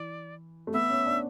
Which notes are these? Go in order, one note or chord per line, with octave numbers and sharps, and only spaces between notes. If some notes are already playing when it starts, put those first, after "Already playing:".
Already playing: E3 D5
A3
B3 E5
C#4
D4